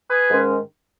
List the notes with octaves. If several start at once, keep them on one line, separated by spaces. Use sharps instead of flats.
G#4 B4
G#2 D#3 G#3 C#4